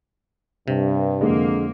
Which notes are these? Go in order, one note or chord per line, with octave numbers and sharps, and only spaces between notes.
G2 C3
F2 D3 G#3 A#3